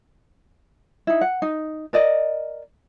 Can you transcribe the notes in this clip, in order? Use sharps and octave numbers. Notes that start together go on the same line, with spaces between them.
D#4 E4
F#5
D#4
A#4 D5 D#5